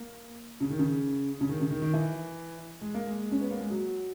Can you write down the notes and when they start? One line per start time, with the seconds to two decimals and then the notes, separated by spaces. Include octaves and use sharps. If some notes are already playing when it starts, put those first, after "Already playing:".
Already playing: A#3
0.60 C#3
0.70 D#3
0.79 C#3
1.41 C#3
1.49 D#3
1.60 C#3
1.71 D#3
1.82 D#3
1.93 E3
2.81 G#3
2.94 A#3
3.07 G#3
3.31 C#4
3.41 B3
3.51 A#3
3.61 G#3
3.70 F#3